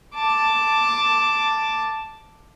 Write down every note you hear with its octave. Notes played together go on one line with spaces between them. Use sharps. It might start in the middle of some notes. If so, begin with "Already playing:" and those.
A5 D6